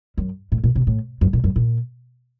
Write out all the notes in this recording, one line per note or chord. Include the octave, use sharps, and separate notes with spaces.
F#2
A2
A#2
C3
A2
F#2
A#2
F#2
A#2